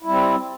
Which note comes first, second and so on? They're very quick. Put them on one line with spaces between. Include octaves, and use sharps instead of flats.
E4 G3 C4